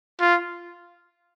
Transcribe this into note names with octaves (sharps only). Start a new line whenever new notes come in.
F4